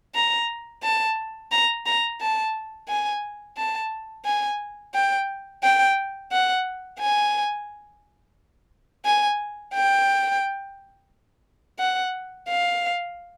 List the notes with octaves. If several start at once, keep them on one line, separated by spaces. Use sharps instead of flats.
A#5
A5
A#5
A#5
A5
G#5
A5
G#5
G5
G5
F#5
G#5
G#5
G5
F#5
F5